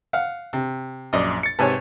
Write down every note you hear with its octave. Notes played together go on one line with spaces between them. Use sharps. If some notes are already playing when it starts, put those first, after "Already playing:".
F5 F#5
C3
A#1 F#2 D5 D#5
A6 C#7
G#2 C3 B4 C#5 G#5 A5